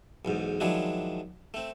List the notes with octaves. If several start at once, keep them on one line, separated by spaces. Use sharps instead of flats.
B1 E2 G#2
D#3 F3 F#3 G#3 D4 E4
A3 C4